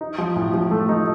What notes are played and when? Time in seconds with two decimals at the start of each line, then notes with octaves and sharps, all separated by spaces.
0.01 D#4
0.18 F3
0.36 A2
0.54 F3
0.71 A3
0.89 D#4